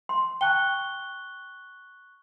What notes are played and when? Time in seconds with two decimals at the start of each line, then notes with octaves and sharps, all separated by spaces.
0.09 C6
0.41 G5 A5 C#6 F#6 G7